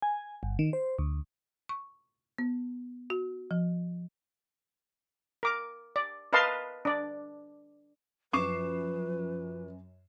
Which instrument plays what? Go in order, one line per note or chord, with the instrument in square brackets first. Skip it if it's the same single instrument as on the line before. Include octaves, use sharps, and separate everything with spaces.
[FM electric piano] G#5
G1
D#3
C5
D2
[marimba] C#6
B3
F#4
F3
[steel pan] A#4 D6
D5
A#4 B4 D#5 F5 A5 C6
D4 D5
[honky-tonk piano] F#2 C7 E7 [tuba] F3 [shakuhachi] B4 [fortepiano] C#6 D6